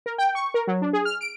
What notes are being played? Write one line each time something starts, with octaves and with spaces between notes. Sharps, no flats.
A#4
G5
C#6
A#4
F#3
D4
G#4
F6
D7